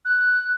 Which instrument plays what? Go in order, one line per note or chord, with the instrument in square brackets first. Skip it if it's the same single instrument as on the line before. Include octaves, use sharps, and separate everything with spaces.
[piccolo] F#6